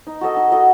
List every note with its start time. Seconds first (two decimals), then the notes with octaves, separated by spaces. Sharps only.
0.07 D#4
0.21 F#4 A4 D#5
0.37 D#4
0.52 F#4 A4 D#5